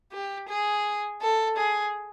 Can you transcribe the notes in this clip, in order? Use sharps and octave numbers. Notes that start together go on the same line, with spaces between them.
G4
G#4
A4
G#4